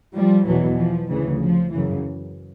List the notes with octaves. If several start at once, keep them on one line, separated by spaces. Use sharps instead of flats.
F3 G3
E2 B2 E3 F#3
F3
D2 C#3 E3
F3
F#2 C#3 E3